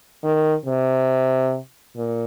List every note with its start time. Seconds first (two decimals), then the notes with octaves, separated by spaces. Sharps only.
0.24 D#3
0.66 C3
1.96 A#2